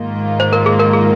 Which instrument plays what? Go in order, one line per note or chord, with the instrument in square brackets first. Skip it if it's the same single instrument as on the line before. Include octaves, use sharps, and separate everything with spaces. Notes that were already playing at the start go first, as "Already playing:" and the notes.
Already playing: [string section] G#2 D#3 A#3 F4
[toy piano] C5
A#4
G#4
A#4
G#4